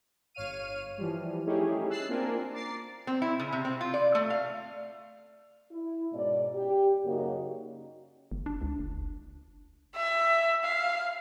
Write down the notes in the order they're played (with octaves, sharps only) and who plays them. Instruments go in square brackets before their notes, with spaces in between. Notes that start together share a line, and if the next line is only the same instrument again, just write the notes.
[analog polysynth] G1 C#5 F5 F6 D#7
E3 F3 G3
A3 C#4 D#4 E4 G4 G#4
E6 F#6 A6 C7
A#3 C4 D4 F4 A#4 G#5
A#5 D6 A6 C7
[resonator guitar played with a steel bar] C4
E4
C#3
C3
C4
F4
D5
A3
F5
[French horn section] E4
G#2 B2 C#4 D5
G4
F#2 C#3 A#3 D#4 F#4
[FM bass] G1
D4
C#2
F#1
[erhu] E5
F5